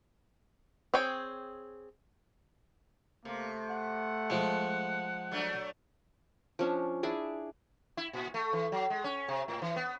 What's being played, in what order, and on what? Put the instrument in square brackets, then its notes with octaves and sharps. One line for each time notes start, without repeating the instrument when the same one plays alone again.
[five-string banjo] C4 G#4 C#5 G5
[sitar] C3 [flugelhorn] A3 [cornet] A#3
[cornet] F#5
[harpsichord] F3 G#3
[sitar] F#3 A3 D4
[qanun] F3 C#4 D4
D4 E4 G#4 D5
[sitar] E4
A#2
A3
E3
F#3
G#3
C#4
C3
A2
E3
B3